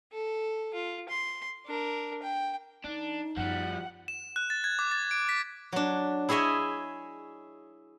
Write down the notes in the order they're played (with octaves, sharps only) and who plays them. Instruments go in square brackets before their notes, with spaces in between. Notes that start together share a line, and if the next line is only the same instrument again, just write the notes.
[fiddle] A4
F4
C6
D4 A#4
G5
[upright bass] F3 [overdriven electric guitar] D4 [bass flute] D#4
[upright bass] F#2 B3 [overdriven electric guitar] F3 G3 [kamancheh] F#5
[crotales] E7
F#6
A6
G#6
D6
A6
D7
B6
[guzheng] F#3 D4
E4 G#4 C#5 D#5 E5